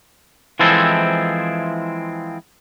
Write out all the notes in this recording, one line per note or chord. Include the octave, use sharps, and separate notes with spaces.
E3 F3 G#3 C4 E4 A4